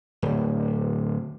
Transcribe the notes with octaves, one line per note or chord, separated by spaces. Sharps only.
D1